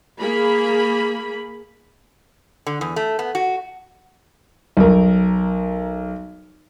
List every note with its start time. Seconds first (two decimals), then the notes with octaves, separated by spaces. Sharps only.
0.18 A#3 G#4 B5
2.67 D3
2.81 E2
2.96 A3
3.19 B3
3.35 F#4
4.77 B1 A#4